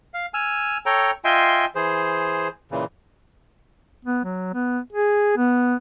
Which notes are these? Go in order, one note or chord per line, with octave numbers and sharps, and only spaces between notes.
F5
G#5 E6 F6
A4 C#5 G5 A#5
F4 D#5 E5 G5 G#5 C6
E3 G#4 C5
A#2 C#3 E3
B3
F#3
B3
G#4
B3